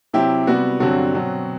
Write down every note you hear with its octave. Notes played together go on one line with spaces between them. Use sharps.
C3 F#3 C4 E4 G4
C3 G3 B3 F#4
G2 D3 F#3 C4 F#4
B2 F#3 C4